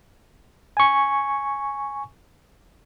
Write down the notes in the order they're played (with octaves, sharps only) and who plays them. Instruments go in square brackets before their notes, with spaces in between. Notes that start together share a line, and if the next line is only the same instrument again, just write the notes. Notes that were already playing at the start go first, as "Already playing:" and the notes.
[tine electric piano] G#5 C#6